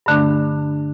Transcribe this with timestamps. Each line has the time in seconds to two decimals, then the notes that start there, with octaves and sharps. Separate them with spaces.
0.06 G2 D3 A3 D4